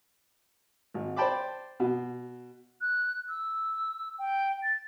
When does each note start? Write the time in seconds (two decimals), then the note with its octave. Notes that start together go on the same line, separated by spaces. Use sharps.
0.94 G#1
1.16 C5 D5 G5 A5 B5 D6
1.80 B2
2.81 F#6
3.29 E6
4.18 G5
4.63 A6